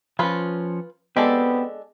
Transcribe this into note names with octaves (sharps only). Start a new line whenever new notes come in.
F3 C#4 F4 B4
G#3 B3 C4 D4 G4 A4